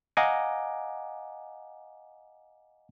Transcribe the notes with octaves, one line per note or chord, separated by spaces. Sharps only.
D#5 F5 F#5 G#5 A#5 D6